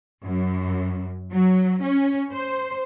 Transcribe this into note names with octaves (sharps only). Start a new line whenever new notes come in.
F#2
F#3
C#4
C5